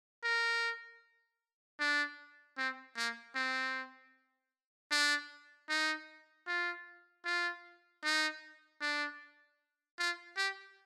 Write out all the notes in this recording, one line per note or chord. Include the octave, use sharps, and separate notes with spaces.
A#4
D4
C4
A#3
C4
D4
D#4
F4
F4
D#4
D4
F4
G4